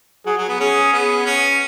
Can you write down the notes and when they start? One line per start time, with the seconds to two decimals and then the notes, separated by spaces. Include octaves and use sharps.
0.26 F#3 G#4
0.37 F#3
0.48 B3
0.60 C#4 G#4
0.93 B3
1.25 C#4